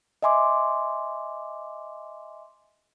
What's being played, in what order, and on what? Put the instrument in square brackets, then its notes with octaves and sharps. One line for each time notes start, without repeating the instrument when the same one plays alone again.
[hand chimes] D#5 E5 G#5 C6 D6